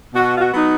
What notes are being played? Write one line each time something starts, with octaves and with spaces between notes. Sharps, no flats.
B2 F#4
F4
F#4
F#3 B3 D#4